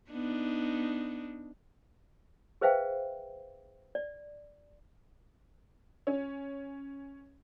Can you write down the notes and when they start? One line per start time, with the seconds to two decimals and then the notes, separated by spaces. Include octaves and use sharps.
0.11 B3 D4 D#4
2.61 G#4 B4 C5 E5 F5 G5
3.95 D5
6.07 C#4